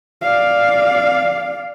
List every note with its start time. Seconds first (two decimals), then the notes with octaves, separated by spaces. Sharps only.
0.22 D5 F5